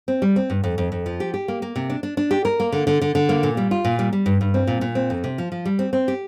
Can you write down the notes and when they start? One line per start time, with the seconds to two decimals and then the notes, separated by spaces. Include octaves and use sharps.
0.08 C4
0.22 G3
0.36 C4
0.50 G2
0.64 F2
0.78 F2
0.92 F2
1.06 F3
1.20 G4
1.34 G4
1.48 A#3
1.62 A#3
1.76 C3
1.90 D4
2.03 D4
2.17 D4
2.31 G4
2.45 A#4
2.60 A#3
2.72 D3
2.87 D3
3.01 D3
3.15 D3
3.29 A#3
3.43 A#2
3.57 G3
3.71 F4
3.85 A#2
3.99 G3
4.13 G3
4.26 G2
4.41 G2
4.54 C4
4.67 A#2
4.81 A#2
4.95 C4
5.10 F2
5.24 C3
5.38 F3
5.52 F3
5.65 G3
5.79 C4
5.93 C4
6.08 G4